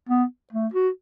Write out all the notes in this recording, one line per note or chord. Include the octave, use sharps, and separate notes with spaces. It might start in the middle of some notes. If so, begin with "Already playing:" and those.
B3
A3
F#4